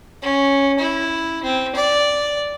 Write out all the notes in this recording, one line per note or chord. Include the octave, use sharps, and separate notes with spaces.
C#4
E4
C4
D5